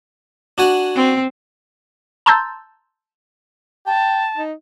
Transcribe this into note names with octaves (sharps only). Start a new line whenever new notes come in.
D4 F#4 G#5
C4
A5 A#5 C6 E6 G6 A6
G5 A5
D#4